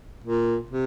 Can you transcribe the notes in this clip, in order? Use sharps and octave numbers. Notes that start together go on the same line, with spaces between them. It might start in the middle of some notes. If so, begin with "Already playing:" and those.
A#2
C3